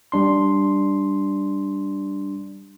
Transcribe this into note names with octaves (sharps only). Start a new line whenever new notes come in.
G3 D4 C6